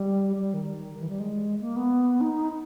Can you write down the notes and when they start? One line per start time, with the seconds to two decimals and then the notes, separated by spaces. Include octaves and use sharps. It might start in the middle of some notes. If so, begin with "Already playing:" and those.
Already playing: G3
0.39 G3
0.54 D#3
1.00 E3
1.09 G3
1.19 G#3
1.61 A#3
1.76 B3
2.21 D#4